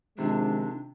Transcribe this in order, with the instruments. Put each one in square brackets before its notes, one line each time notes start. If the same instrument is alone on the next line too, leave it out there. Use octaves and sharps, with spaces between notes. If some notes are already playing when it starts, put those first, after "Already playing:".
[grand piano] C3 [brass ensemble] D#3 F3 G#3 [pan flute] D4